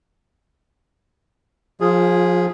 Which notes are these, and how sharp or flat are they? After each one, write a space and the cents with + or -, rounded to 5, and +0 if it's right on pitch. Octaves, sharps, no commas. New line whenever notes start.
F3 +30 F4 +0 G#4 +0